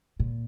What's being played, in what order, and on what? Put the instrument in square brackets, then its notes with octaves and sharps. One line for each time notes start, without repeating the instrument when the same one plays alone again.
[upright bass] A#2